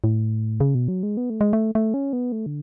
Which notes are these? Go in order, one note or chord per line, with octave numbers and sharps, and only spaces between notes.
A2
C#3
B2
F#3
G#3
B3
A3
G#3
A3
A3
C#4
B3
A3
D3